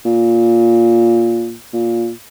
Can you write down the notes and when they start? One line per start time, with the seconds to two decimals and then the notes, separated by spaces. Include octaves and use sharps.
0.05 A#2
1.73 A#2